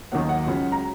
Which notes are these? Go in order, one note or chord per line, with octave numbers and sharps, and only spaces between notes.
D#2 D#3 F#3 A#3 F#5
F#5
C#2 C#3 F#3
A#5